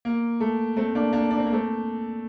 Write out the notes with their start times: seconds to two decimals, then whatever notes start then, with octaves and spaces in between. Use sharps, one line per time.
0.05 A#3
0.40 A3
0.77 A3 C4
0.95 A#3 D4
1.13 A#3 D4
1.30 D4
1.38 C4
1.46 A#3
1.53 A3 C4